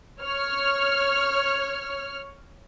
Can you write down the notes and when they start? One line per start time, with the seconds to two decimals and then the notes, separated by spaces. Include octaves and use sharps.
0.22 C#5 F6